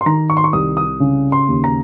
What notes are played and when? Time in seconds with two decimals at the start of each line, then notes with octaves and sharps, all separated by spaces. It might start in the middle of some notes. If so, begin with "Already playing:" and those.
0.01 C6
0.06 D#3 A#5
0.30 C#6
0.37 C6
0.44 C#6
0.53 C2 D#6
0.77 D#6
1.00 C#3
1.32 C6
1.48 D#2
1.64 A#5